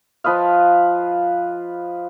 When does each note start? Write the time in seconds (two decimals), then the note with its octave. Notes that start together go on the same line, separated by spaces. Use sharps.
0.24 F3 B4 D#5 F5